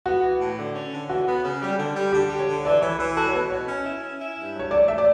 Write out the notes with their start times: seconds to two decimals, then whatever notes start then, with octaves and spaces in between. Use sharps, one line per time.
0.06 B3 F#4
0.23 E3
0.40 A2
0.58 D3
0.75 C#4
0.92 D3
1.09 E3 F#4
1.27 B3
1.44 C#3
1.62 G3
1.78 D3
1.95 G3
2.12 D3 G4
2.30 G4
2.39 C#5
2.47 D3
2.64 E3 D5
2.81 E3 C#5
2.99 E3 B4
3.16 F#4 A4
3.28 C#5
3.33 B2 B4
3.50 B2 C#5
3.68 C#4
3.85 E4
4.02 C#4
4.19 E4
4.37 G2
4.54 F#3
4.59 C#5
4.71 A3 D5
4.88 A3 E5
4.98 D5